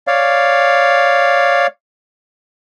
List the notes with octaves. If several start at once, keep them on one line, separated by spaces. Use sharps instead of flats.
C#5 D5 F5